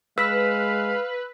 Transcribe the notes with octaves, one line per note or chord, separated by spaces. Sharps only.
G#3 B4 F5 E6 B6